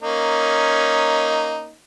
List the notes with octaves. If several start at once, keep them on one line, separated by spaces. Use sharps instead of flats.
A#3 C#4 D#4